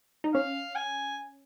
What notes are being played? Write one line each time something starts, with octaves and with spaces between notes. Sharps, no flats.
D#4
C#4 F5
G#5